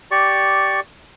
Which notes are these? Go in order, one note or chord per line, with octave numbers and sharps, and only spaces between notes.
G4 D5 C#6